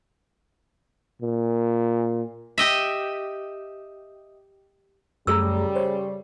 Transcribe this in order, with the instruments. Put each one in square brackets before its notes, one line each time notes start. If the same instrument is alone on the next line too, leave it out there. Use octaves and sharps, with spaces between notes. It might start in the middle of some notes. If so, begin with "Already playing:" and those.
[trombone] A#2
[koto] G4 D#5 E5
[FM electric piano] F#2 A3 A#5 [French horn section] C#3 G3 [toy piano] G#4 A4 E6
[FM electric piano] C5 C#5